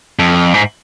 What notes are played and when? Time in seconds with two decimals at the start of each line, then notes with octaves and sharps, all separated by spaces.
0.19 F2
0.54 G#2